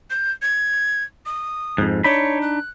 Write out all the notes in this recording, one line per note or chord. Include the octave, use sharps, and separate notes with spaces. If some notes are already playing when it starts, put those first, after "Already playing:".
G6
G#6
D#6
F2 G#2
D4 D#4 C#5 B5
F#6